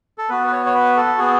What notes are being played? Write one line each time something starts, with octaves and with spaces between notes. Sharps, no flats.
A4
B3 F#4 B4
B4
C#5
C#5
B4
A4
B3 F#4 G#4